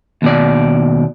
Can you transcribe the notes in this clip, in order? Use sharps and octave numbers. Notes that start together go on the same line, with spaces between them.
D#2 B2 D5